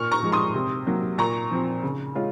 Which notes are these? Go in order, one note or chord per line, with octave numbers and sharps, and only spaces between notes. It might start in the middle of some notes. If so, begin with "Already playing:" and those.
Already playing: A#2 C#6 F6
A#5 C#6
F3 G#3
C6 D#6
C3
F#3 A#3
A#2 A#5 C#6
F3 C4
C#3
G#3 C#4 F4